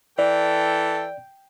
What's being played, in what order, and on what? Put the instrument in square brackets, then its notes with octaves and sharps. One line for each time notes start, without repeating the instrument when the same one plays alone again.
[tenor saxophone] E3 [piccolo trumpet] A4 [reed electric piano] D5 [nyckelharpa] G5